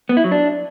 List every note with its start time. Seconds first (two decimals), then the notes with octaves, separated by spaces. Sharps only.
0.09 B3
0.17 E4
0.24 F#3
0.32 D4